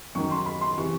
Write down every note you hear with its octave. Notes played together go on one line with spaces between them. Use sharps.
F#2 D#3 F#3 C#6
C6
B5
C6
C3 E3 C#6